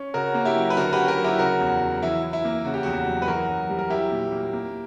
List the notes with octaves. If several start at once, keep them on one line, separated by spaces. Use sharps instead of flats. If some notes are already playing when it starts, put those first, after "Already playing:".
Already playing: C#4
C#3 F#4 A#4
A#3
E4 G4
F#3
B4
D3 F#4 A#4
C#4 G4 B4
F#4 A#4
F#3
E4 G4
C#3 F#4 A#4
E2
F#3
E3 E4
E4
E4
A#3
C#3 F#4
G4
E2 F#4
F#3
B4
E3 F#4 A#4
F#2
G3
A#4
F#3 E4 G4
A#2
A#3
A#3